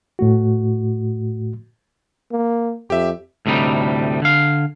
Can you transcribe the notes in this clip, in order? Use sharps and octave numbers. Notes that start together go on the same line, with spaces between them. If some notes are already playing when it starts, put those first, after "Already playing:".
A2 A3 F#4
A#3
F2 G4 E5
D2 A2 C3 G3 D#4
D3 F5